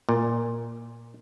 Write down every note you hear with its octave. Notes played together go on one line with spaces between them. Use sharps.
A#2